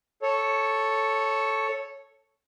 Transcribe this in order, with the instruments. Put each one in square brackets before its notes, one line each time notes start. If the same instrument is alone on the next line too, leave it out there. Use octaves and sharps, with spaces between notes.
[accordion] A4 C#5